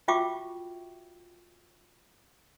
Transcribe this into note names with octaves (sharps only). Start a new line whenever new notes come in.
F4 F#4 E5 G5 C#6 D6